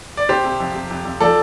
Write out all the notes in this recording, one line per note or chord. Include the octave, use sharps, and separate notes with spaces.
D5
C3 G4 C5
C3
F2
C3
F2
F2
F3 A4 D5